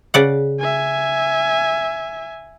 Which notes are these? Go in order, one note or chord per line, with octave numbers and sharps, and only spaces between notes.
C#3 D5 F#5
E5 G#5